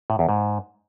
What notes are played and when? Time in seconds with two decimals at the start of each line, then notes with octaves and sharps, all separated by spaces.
0.10 A2
0.19 E2
0.29 G#2